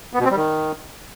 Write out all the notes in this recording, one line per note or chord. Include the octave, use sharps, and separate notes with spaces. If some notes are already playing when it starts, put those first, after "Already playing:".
B3
B2
C4
G3
D#3